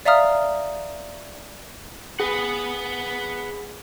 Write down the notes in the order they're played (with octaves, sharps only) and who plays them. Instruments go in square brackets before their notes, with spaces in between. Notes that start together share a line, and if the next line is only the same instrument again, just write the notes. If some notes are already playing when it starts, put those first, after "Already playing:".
[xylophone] D5 E5 F5 A#5 D#6 F6
[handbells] G#4 [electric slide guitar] B4 F#5